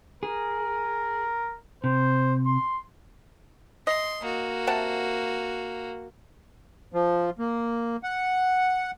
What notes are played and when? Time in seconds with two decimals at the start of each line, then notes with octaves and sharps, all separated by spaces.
0.23 G#4 A#4
1.84 C3 C5
2.46 C6
3.87 D#5 C6
4.22 A#3 F#4
4.67 C3 F#5 A5
6.93 F3
7.39 A#3
8.03 F#5